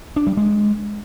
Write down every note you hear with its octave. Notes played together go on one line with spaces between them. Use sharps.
D4
G3
G#3